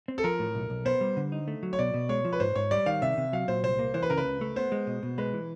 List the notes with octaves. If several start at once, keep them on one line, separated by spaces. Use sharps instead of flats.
C4
A4
F3 A#4
A2
B1
B1
B3 C5
G3
D3
D#4
A3
F#3
C#5
B2 D5
B2
G#3 C#5
F3
B4
G#2 C5
G#2 C#5
G3 D5
D#3 F5
C3 E5
C3
F#3 F5
A#2 C5
C2 C5
A#3
E3 C5
B4
C#3 A#4
B4
C#2
A3
B3 C5
G#3
B2
B2
G#3 B4
E3